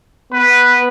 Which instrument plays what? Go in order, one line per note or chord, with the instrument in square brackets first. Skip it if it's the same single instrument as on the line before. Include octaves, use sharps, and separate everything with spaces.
[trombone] B3 [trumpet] B4